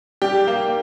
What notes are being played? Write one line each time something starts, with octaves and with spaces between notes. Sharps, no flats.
G3 G4
A#3